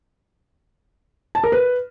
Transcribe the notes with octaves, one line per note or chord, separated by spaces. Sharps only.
A5
A#4
B4